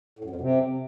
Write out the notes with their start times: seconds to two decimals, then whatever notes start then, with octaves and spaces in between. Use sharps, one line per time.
0.19 A2
0.24 F#2
0.30 F2
0.36 F#2
0.41 C3